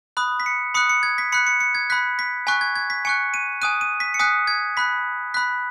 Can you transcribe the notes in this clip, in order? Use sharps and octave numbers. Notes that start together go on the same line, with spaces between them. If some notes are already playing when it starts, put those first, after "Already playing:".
B5 D#6 F#6
B6
C#7
B5 D#6 F#6 C#7
C#7
G#6
B6
B5 F#6 C#7
C#7
C#7
G#6
B5 F#6 B6
B6
G#5 C#6 F#6 B6
G#6
G#6
B6
G#5 C#6 F#6 C#7
D#7
G#5 D#6 F#6 D#7
D#7
B6
C#7
G#5 D#6 F#6 B6
G#6
B5 F#6 B6
B5 F#6 B6